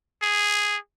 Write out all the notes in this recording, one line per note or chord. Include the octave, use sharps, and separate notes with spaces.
G#4